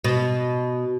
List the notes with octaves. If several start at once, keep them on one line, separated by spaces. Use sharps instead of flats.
B2